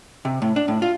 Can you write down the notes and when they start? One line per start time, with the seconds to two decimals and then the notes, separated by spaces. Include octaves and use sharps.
0.25 C3
0.42 A2
0.56 D4
0.68 A2
0.82 F4